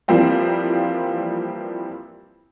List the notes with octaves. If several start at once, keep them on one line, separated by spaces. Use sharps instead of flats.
E3 F3 G3 A#3 C4 F4